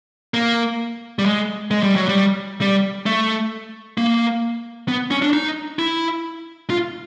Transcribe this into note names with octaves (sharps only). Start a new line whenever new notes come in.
A#3
G3
G#3
G#3
G3
F#3
G3
G3
A3
A#3
B3
C#4
D4
D#4
E4
F4